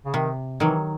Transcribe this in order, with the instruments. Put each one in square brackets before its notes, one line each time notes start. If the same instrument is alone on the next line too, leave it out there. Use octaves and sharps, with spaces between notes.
[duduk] C#3
[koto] C3 [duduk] D#3
[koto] D#3 F#3 [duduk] E3